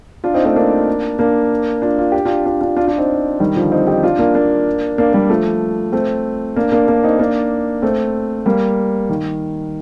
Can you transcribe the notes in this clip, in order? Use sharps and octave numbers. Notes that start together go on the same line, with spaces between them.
D4 F4
C4 D#4
A3 C4
A#3 D4
A#3 D4
D4 F4
F4
G4
D4 F4
D4 F4
D4 F4
D4 F4
D4 F4
C4 D#4
D#3 G3
D3 F3
C4 D#4
D#4 G4
D4 F4
A#3 D4
A#3 D4
A#3 D4
G3 A#3
F3 A3
A3 C4
A#3 D4
A#3 D4
A#3 D4
C4 D#4
A#3 D4
A3 C4
G3 A#3
D#3